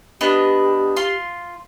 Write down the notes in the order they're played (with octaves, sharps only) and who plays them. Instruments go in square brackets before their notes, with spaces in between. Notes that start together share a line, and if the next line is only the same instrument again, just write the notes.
[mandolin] B3 D4 D#5 [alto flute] G4
[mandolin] F4 C6